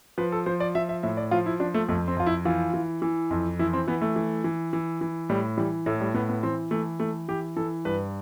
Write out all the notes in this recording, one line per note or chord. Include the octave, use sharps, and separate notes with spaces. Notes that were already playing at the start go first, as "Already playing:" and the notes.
F3 B4
A4
F3 C5
D5
F3 E5
E5
A2 E5
D5
F3 F4
E4
F3 D4
A3
F2 A3
C4
F2 F4
E4
E3 F4
E3
E3
F2
E3 E4
C4
E3 B3
A3
E3
E3
E3
E3
A2 G3
E3 G3
A2 A3
G3
A2 B3
B3
E3 C4
E3 A3
E3 A3
E3 G4
E3 A4
G2 B4